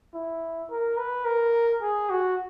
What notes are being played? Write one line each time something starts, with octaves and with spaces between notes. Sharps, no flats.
E4
A#4
B4
A#4
G#4
F#4